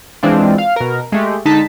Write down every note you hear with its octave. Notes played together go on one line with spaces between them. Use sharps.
E3 G#3 C4 D4 F4
F5
B2 A#4
G#3 A3 G4
D3 G#3 D#4 A5 B6